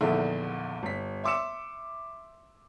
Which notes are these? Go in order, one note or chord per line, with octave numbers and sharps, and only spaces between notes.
A#1 E2 D3 D#3 A4 E5
G1 B6
E5 C6 D6 E6 C#7 E7